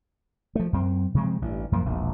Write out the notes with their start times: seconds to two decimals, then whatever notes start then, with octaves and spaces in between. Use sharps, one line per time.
0.55 F3 A3
0.73 F#2 C4
1.14 C3 F3 G#3 C4
1.42 A1 G2
1.72 F#2 F3 A#3
1.85 E1 A#1